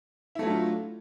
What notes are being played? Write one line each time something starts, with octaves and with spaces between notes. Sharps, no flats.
F#3 A3 D4 E4 F4